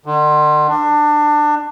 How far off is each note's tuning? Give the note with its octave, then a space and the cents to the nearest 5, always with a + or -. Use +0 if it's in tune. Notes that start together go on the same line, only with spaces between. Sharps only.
D3 +45
D4 +20